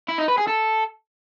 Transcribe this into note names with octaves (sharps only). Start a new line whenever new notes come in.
E4
D#4
B4
G#4
A4